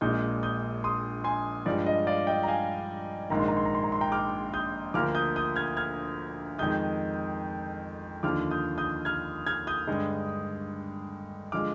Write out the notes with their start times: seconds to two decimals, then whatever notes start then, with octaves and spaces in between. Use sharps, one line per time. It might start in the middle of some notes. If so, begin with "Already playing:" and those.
0.01 A#1 A#2 G#3 D#6 G6
0.43 D#6 G6
0.84 C6 D#6
1.24 G#5 C6
1.66 G2 F3 G#3 D5
1.86 D#5
2.07 D5 F5
2.27 D#5 G5
2.43 A#5
2.48 F5 G#5
3.30 A#1 G#2 D#3 A#3 A#5
3.40 C6
3.48 A#5
3.57 C6
3.65 A#5
3.75 C6
3.84 A#5
3.92 C6
4.01 G5 A#5
4.12 D6 F6
4.53 D#6 G6
4.94 D2 D3 F3 A#3 D6 F6
5.15 D#6 G6
5.36 D#6 G6
5.56 F6 G#6
5.77 F6 G#6
6.59 F2 D#3 G#3 D#6 G6
8.23 D#2 D3 F3 D6 F6
8.51 D#6 G6
8.78 D#6 G6
9.05 F6 G#6
9.47 F6 G#6
9.67 D#6 G6
9.87 G2 D3 G#3
11.52 D3 F3 G#3 D6 F6